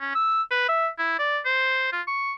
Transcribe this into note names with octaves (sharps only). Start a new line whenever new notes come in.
C#4
E6
B4
E5
E4
D5
C5
F4
C#6